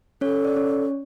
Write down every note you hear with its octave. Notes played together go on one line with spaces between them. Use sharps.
C#4 A4 C#5
D5
C#4 C#5